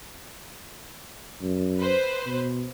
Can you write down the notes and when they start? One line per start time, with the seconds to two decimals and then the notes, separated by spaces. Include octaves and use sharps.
1.41 F#2
1.79 B4 C5
2.26 B2